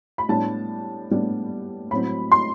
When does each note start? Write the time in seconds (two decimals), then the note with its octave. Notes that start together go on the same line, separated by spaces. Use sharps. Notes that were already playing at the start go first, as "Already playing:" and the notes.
0.18 B5
0.28 A2 G3 B3 D4 A5
1.10 A2 G3 B3 D4
1.91 A2 F#3 C4 B5
2.32 C6